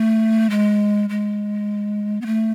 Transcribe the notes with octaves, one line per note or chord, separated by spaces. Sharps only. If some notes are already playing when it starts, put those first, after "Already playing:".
Already playing: A3
G#3
G#3
B3
A3